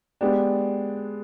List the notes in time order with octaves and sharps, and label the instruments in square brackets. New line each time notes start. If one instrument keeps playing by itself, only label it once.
[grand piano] G#3 B3 D4 G4